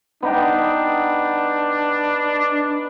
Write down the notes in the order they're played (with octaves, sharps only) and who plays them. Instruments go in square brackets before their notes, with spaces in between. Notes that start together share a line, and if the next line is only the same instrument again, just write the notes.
[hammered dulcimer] B3 D#4 G5 [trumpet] D4